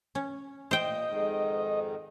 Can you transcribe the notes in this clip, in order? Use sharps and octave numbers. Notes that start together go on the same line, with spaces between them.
C#4
A#2 C5 D#5 G5
F2 G#2 D#3